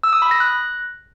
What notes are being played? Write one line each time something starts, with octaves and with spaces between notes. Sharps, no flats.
E6
D#6
B5
A#6
F#6